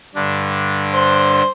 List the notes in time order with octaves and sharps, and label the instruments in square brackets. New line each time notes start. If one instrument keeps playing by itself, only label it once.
[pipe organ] G2 D3 D4
[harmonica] C5